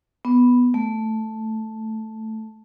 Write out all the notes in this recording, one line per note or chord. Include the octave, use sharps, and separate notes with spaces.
B3
A3